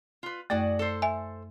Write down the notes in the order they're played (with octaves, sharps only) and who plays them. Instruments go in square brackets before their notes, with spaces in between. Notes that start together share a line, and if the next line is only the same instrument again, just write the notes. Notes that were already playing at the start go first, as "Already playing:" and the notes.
[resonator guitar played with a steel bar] F4 B4
[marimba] F#2 A3 [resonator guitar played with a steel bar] F#4 G#4 D5
[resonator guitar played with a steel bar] A4 C5
[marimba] E5 G#5